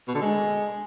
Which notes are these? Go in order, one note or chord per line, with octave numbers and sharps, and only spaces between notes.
B2
D3
G#3